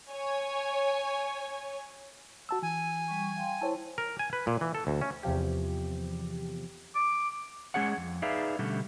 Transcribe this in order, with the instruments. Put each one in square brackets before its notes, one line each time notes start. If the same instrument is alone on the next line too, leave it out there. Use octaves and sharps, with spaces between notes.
[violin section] C#5 G#5
[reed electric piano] F#4 A5 E6
[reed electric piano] E3 [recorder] G#5
[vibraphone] G3 C#6
F5 G5 C6
[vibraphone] E4 [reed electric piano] C5 C#5 A5
[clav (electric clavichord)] A#4
G#5
B4
A#2
E3
A4
D2
C#4
[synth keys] E2 C3 F3 G4
[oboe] D6
[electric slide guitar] G#3 C#4 G#4 C#5 F#5
F2
D#4 G#4 B4 D5 E5 F5
B2 D3 G3 A3 C#4